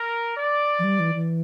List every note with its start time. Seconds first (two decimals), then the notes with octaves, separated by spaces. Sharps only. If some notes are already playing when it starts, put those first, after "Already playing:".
Already playing: A#4
0.37 D5
0.79 F3
0.84 G3
1.00 E3
1.15 E3